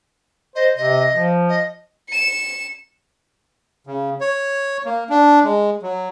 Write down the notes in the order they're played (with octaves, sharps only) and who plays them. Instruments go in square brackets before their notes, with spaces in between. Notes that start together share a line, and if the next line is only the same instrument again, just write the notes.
[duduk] C5 [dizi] D#5
[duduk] C3 [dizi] D#5
[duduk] F3
[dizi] D#5
[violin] C#7 E7
[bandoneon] C#3
C#5
A#3
D4
G#3
F#3